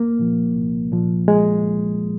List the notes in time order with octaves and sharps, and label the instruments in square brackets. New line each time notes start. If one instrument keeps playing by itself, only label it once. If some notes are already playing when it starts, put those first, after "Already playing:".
Already playing: [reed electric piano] C2 A#3
A#2 F3
C2
A#2 F3
G#3